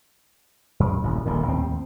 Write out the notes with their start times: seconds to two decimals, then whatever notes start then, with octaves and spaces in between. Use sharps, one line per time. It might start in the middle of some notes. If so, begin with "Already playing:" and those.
0.80 F#2
1.03 D#1 A1
1.25 D#1 A#1 A2 D#3
1.48 D#2 A2 C4